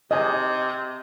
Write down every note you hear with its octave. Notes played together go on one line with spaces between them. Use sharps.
C3 D#5 G#5